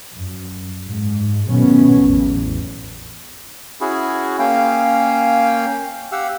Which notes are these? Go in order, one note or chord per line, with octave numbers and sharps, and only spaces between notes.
F#2
G#2
B2 D#3 F#3 A3 B3 C#4
A1 E2
C#4 E4 F#4 G#4
A#3 C#4 F5 G5
G4 F5 F#5 E6